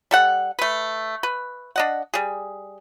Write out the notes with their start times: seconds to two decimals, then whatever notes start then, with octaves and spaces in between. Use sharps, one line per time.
0.11 G3 A4 F#5
0.59 A3 B4
1.23 B4
1.76 D4 D#5 F#5
2.14 G3 G#4